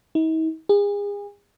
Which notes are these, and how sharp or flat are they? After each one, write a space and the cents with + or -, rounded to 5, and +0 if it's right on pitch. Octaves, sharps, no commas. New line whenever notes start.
D#4 +45
G#4 -35